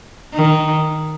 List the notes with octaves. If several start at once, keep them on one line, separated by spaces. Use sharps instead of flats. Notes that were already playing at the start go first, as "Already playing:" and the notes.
D#3